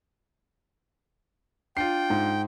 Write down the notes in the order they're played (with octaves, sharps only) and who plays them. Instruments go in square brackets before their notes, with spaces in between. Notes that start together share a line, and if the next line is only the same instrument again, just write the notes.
[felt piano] D4 F4 [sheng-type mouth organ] G5 [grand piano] C7
[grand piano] G#2